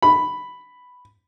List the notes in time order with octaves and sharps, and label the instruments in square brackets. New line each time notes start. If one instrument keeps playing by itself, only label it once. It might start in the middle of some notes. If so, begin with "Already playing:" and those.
[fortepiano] B5